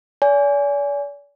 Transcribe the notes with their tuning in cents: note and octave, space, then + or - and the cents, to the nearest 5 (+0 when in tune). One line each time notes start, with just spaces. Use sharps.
D5 -40 G#5 +0